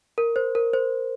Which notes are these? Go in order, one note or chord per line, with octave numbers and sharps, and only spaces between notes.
A#4
C5
A#4
C5